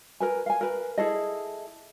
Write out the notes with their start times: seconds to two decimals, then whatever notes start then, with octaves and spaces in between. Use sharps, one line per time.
0.20 A#4 B4 G#5
0.46 F5 G#5
0.61 A#4 B4
0.97 E4 G#4 A4 D#5